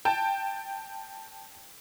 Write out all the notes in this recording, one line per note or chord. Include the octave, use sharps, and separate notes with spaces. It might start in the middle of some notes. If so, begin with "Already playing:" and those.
G5 A5